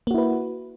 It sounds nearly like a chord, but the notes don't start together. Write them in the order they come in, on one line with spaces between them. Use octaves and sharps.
A#3 F#4 E4 B4